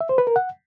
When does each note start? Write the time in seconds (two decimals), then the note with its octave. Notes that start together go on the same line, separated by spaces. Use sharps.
0.01 E5
0.09 C5
0.18 B4
0.27 A#4
0.36 F#5